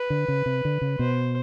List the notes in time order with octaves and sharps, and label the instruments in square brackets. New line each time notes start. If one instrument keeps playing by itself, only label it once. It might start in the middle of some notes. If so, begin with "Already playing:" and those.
Already playing: [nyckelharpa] B4
[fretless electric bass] D3
C#3
C3
D3
C#3
[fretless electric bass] B2 [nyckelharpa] C5